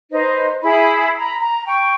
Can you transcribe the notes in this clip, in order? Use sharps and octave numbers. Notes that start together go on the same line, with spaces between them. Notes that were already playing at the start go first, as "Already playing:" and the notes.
D#4 B4 C5
E4 G#4 B5
A#5 B5
A#5
G5 C#6